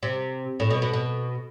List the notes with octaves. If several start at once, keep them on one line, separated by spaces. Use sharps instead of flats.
C3
A2
B2
B2
B2